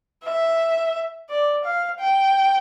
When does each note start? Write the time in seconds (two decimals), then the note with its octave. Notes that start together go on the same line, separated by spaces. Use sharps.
0.24 E5
1.30 D5
1.65 F5
2.00 G5